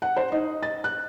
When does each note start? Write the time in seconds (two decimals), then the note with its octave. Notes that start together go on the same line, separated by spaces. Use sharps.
0.02 F#5
0.16 C5
0.32 D#4
0.63 A6
0.84 F#6